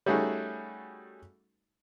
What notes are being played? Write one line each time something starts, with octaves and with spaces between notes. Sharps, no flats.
G3 A3 C#4 D#4 F#4 G#4